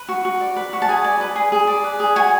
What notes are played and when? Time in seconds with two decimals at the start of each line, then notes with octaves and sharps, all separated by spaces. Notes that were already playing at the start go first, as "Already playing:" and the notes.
Already playing: B4
0.09 F#4
0.25 F#4
0.40 D5
0.56 B4
0.73 F#4
0.82 A5
0.88 G#4 G#5
1.04 D5
1.21 B4
1.36 G#4
1.52 G#4
1.67 D5
1.84 B4
2.00 G#4
2.16 F#4 G#5